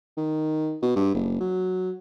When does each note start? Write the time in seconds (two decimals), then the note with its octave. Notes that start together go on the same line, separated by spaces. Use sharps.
0.17 D#3
0.82 B2
0.96 G2
1.14 F#1
1.40 F#3